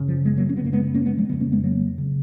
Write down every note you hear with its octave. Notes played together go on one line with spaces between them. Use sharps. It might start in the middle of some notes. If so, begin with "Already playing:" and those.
Already playing: F#2 C#3
F3
G#3 B3
F#3 A#3
C#4
B3
F#2 C#3 A#3
G#3 B3
A#3 C#4
G#3 B3
F3 G#3
F2 C#3 G#3 B3
A#3 C#4
G#3 B3
F#3 A#3
C#3